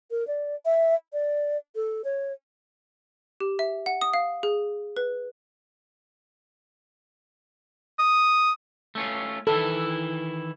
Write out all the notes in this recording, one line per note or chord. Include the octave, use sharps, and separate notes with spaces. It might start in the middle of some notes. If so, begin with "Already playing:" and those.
A#4
D5
E5
D5
A4
C#5
G4
E5
F#5
D#6
F5
G#4
B4
D#6
A3 C#4 F4
D#3 E3 E4 A4